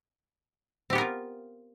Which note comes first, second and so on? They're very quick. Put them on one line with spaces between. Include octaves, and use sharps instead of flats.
C4 G4 B3 A#4 F4